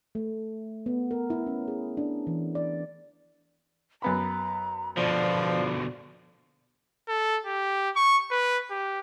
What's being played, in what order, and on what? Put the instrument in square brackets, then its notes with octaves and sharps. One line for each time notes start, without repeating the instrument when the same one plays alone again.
[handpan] A3
B3
A#4
E4
C#4
G#4
D4
E3
D5
[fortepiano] F#2 B3 B5 [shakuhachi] A#5
[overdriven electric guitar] B2 D3 [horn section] F3 [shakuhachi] D5
[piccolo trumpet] A4
G4
C#6
B4
G4